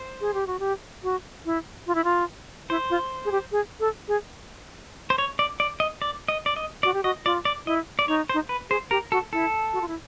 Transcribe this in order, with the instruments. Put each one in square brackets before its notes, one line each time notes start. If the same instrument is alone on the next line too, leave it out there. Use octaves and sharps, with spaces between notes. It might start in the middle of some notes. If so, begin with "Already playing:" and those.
Already playing: [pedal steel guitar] C5
[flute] G#4
G4
F#4
G4
F#4
E4
F4
E4
F4
[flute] E4 [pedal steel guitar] C5
[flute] F4
G#4
G4
G#4
A4
G#4
[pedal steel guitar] C5
C#5
D5
D5
D#5
D5
D#5
D5
D#5
[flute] F#4 [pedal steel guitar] D5
[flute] G4
[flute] F#4 [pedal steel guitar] D#5
[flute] F4 [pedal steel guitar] D5
[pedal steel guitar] D5
[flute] E4 [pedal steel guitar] D#5
[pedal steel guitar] D5
[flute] D#4 [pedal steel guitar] C#5
[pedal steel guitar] C5
[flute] D#4
[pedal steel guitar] B4
[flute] G#4 [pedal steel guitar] C5
[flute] G4 [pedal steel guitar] A#4
[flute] F#4 [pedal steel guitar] A4
[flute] E4 [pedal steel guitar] A4
[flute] F#4
F4
E4